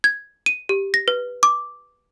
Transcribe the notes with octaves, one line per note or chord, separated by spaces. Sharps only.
G#6
D#7
G4
A#6
B4
D6